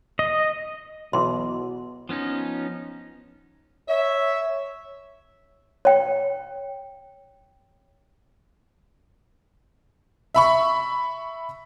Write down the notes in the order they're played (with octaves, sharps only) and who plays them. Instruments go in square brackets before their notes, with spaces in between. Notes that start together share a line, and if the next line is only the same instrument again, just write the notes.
[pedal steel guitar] D#5
[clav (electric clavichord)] B1 E3 [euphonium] B2 [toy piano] C6
[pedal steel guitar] F3 B3 C#4 D#4
[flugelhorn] C#5 [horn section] E5
[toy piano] C#5 G5
[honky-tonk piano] E5 B5 C#6